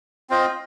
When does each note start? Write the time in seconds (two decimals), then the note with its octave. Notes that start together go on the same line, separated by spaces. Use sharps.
0.30 C4 F4 C5 D#5